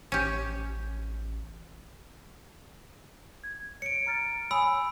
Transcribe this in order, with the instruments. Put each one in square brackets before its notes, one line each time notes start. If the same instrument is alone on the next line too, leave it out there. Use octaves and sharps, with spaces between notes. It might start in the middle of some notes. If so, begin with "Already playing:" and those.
[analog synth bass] A1 [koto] C#4 G4
[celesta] G#6
[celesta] C#5 [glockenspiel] C#7 D7
[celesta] A#5 F6 A6
[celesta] C#5 G#5 D#6 [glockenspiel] B5 E6